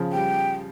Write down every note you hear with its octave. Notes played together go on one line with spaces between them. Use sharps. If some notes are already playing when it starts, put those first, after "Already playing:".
Already playing: C#3 F3
G3 G5